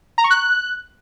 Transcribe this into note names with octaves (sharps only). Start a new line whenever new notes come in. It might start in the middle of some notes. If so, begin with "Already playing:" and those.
A#5
C#6
F#6